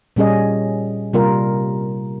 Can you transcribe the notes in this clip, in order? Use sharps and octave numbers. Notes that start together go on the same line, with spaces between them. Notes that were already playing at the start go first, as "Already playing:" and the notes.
A#2 G3 C#4 G#4 D#5
C3 G3 A#3 F4 A#4